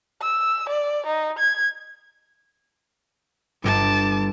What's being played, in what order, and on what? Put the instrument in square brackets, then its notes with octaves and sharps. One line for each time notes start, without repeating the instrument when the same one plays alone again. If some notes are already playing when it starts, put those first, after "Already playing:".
[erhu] E6
D5
D#4
G#6
[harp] G1 [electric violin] A5 D6